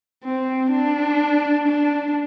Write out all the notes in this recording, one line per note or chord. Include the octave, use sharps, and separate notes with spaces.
C4
D4
D4